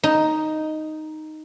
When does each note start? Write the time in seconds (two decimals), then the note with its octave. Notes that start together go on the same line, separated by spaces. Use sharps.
0.04 D#4